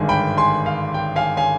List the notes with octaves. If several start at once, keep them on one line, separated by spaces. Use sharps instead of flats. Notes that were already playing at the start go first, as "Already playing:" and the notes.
Already playing: G#1 G2 D3 G#3 G#5
G5 B5
G#5 C6
F5
G5
F5 G#5
F5 G#5